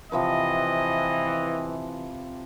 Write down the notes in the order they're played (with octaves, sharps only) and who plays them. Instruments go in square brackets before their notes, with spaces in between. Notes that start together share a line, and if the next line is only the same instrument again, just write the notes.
[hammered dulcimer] C3 F3 B4 [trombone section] E3 [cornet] D#5